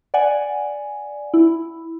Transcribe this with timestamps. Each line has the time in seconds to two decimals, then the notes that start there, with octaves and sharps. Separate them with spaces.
0.14 D5 F#5 G#5
1.34 E4